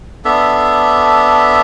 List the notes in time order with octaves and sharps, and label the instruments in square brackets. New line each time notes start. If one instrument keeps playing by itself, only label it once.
[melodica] B3 D4 A4 E5